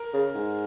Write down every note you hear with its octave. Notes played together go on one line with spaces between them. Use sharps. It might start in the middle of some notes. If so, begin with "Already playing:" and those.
Already playing: A#4
C#3
G#2